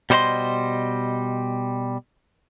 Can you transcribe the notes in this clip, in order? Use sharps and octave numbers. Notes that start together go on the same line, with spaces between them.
B2 G3 C5 C#5 D#5 C6